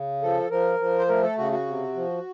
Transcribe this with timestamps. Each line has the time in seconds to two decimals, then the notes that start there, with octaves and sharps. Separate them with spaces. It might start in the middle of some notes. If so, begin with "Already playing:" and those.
Already playing: C#3
0.22 F3 A4
0.50 F3 A#4
0.79 F3
0.98 C5
1.08 A3 A#4
1.23 A4
1.38 C#3 F#4
1.52 F#4
1.67 C3
1.95 F3